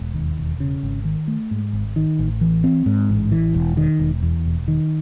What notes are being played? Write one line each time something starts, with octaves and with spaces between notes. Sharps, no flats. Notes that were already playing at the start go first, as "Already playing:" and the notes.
Already playing: E1
D#2
E1
C#3
G#1
D#3
A3
G#2
G#1
D#3
A1
E3
C4
G#2
A1
E3
E1
D#3
E1
E2
E1
D#3